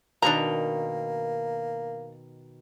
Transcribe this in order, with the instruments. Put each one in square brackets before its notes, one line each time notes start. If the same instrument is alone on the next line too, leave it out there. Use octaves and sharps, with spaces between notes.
[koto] B2 D#3 [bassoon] A#3 [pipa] D4 A#5